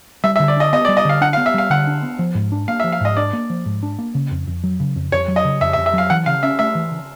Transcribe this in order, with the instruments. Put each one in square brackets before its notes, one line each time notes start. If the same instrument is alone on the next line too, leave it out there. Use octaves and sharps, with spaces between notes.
[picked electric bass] G3 [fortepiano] E5
[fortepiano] E5
[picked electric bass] D3
[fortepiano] D5
[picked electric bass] D4 [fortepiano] D#5
[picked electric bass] B3 [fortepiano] D#5
[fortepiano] D5
[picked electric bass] G3
[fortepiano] D#5
[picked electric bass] D3 [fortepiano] F5
[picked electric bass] D4 [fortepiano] F#5
[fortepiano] F5
[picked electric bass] B3
[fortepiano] E5
[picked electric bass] G3 [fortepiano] F5
[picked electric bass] D3 [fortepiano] F#5
[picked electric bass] D4
B3
F3
G#2
D4
[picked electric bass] A#3 [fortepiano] F5
[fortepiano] E5
[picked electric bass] F3
[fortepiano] F5
[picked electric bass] G#2 [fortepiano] D#5
[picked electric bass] D4 [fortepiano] D5
[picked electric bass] A#3
F3
G#2
D4
A#3
C#3
F2
F2
F#3
C#3
F2
[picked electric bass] F2 [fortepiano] C#5
[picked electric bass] F#3
[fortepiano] D#5
[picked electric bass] C#3
[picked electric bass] F2 [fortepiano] E5
[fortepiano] E5
[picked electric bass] F2
[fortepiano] E5
[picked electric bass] F#3 [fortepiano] F5
[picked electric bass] E3 [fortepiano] F#5
[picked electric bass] C#3 [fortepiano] F5
[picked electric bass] C#4 [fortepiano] E5
[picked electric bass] A3 [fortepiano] E5
[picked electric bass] E3
C#3